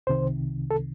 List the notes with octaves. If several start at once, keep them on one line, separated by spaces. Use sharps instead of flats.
C2 C3 D#3 C5
A4